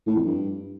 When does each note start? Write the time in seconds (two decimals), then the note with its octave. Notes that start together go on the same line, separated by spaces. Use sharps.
0.07 A2
0.16 F2
0.25 G2